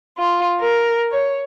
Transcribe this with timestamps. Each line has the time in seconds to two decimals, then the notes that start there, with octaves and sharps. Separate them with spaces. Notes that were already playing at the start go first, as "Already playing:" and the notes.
0.18 F4
0.59 A#4
1.11 C#5